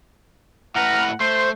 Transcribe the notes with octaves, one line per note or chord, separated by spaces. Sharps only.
A2 B4 F#5 A#5 F6
A3 C5 C6